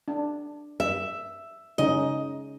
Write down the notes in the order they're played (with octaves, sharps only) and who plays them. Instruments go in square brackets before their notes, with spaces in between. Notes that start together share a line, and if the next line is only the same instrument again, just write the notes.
[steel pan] D4
[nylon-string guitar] E5
[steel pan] C#3 C#4 D#4 [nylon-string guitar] D#5